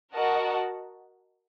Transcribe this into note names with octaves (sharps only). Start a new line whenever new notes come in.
F#4 A#4 D#5 F#5 A5